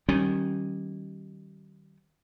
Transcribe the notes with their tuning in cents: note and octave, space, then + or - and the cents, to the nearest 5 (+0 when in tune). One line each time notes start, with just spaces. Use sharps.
D#3 -10 G3 -35 C#4 -20